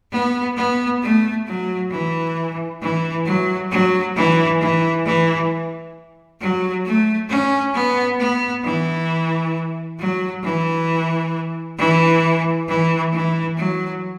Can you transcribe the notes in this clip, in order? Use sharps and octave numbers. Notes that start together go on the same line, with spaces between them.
B3
B3
A3
F#3
E3
E3
F#3
F#3
E3
E3
E3
F#3
A3
C#4
B3
B3
E3
F#3
E3
E3
E3
E3
F#3